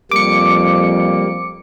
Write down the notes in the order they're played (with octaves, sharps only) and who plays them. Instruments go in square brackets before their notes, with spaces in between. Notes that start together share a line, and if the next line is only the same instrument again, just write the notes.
[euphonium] F2 [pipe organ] G3 A#3 [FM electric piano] D6 C#7